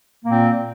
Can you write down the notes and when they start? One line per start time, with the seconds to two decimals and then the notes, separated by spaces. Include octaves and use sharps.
0.24 A#3
0.27 A#2
0.30 C4